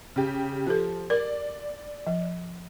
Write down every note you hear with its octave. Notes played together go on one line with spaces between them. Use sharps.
C#3 G4
F3 G4 A4
A#4 D5
F3